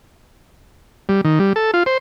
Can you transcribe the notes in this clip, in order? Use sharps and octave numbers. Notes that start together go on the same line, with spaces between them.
G3
D#3
G3
A4
F4
C5